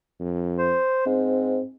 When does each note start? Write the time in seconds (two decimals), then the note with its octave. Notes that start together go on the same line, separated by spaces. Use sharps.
0.20 F2
0.58 C5
1.06 G#2 C4